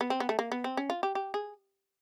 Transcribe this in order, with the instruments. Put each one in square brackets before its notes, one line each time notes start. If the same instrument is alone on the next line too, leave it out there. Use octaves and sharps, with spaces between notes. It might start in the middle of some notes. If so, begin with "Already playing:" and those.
[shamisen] B3
C4
B3
A3
A#3
B3
C4
C#4
F4
G4
G4
G#4